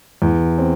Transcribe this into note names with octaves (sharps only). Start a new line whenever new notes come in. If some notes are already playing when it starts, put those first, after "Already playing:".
E2
C4